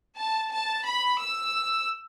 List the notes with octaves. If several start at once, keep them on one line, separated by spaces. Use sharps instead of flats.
A5
A5
B5
E6